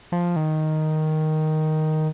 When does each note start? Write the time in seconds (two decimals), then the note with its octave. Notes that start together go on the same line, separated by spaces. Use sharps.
0.12 F3
0.36 D#3